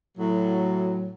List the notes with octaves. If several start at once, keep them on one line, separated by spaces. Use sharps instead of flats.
A2 F#3